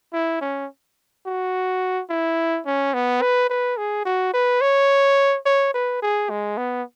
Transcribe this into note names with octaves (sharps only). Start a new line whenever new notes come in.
E4
C#4
F#4
E4
C#4
B3
B4
B4
G#4
F#4
B4
C#5
C#5
B4
G#4
G#3
B3